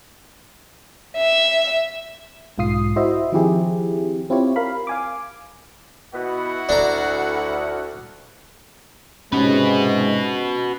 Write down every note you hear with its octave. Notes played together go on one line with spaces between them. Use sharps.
E5
B1 G#2 F4 D#6 C7
E4 F#4 C5 D#5 E5
D#3 F3 C4 E4 G4 G#4
C4 E4 F4 G4 C#5
A#4 F5 B5
F5 G#5 D6
B2 B3 E4 F#4 F#5
D2 D4 A#5
G#2 C3 G#3 C#4 F#4 B4